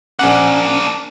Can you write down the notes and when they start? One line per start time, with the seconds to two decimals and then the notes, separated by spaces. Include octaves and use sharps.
0.19 A#1 A#3 C#4 D4 F#5